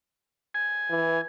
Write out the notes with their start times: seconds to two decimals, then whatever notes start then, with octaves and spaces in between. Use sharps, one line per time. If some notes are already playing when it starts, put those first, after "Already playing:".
0.54 G#5
0.90 E3